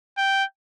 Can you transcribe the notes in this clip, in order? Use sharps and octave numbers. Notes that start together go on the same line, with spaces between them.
G5